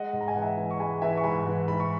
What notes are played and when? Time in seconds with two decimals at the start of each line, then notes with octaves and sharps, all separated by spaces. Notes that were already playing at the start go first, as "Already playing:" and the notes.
Already playing: G#3 D#5 F#5
0.13 G#2
0.21 A#5
0.28 G#5
0.35 E3 F#5
0.42 E5 G#5
0.57 E3
0.71 C#6
0.79 G#3 G#5 B5
1.01 E3 E5 G#5
1.17 C#6
1.24 G#2 G#5 B5
1.46 E3
1.68 G#2 B5
1.80 C#6